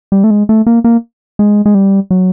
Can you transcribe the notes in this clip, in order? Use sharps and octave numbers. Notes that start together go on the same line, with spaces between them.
G3
A3
G#3
A3
A#3
A#3
G#3
G#3
G3
F#3